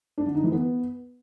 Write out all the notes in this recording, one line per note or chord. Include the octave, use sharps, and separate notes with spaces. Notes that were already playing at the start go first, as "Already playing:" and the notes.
D4
D3
D#4
E3
B3